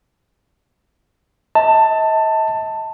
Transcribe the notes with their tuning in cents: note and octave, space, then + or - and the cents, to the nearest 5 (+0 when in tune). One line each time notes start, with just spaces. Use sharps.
D#5 +45 A5 +15